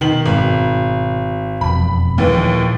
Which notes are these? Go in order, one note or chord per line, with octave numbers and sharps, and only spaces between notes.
B2 D#3 F#7
G#1
E1 F2 B5
D#2 A#2 E3 F3 G#3